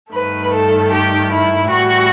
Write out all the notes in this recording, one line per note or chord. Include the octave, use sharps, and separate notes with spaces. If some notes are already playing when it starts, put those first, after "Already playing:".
G2 D#3 A3 B4
A4
G4
E4
A2 E3 G3 F#4